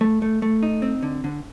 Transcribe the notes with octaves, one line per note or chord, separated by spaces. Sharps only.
A3
A3
A3
D#4
C4
D3
D3